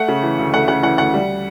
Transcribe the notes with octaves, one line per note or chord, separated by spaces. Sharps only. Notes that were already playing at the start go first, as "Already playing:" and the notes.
Already playing: A3 F#5
C#3
E3
D2
A3 F#5
C#3 F#5
E3 F#5
D2 F#5
G3